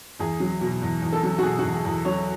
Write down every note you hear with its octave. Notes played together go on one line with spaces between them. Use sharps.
E2 G#4
F#3
B2
E2
E2
A4
F#3
F#4
B2 G#4
F#4
E2
G#4
E2
F#3 C#5